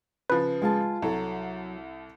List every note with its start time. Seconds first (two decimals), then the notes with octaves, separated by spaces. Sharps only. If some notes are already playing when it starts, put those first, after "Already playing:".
0.30 C#3 F3 B4
0.62 G#3 F4 A5
1.02 C2 F#3 A4